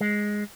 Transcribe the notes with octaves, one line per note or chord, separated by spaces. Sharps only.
G#3